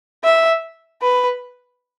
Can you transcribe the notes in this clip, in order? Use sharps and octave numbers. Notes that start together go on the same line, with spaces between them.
E5
B4